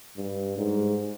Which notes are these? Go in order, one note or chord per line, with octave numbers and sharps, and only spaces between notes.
G2
G#2